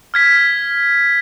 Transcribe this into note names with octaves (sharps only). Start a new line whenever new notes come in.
F6 G#6 B6